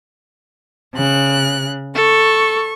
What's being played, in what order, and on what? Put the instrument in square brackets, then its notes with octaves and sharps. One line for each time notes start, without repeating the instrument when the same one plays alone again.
[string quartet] C#3 F#6
[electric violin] A4 [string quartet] C#6